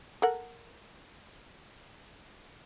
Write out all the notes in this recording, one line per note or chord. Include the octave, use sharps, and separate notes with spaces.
A4 A#4 F#5